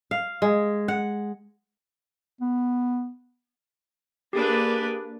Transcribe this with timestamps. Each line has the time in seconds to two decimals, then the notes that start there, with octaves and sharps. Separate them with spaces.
0.11 F5
0.42 G#3
0.88 F#5
2.41 B3
4.33 A#3 D4 G4 G#4 B4